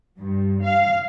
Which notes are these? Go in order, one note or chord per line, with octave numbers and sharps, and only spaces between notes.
G2
F5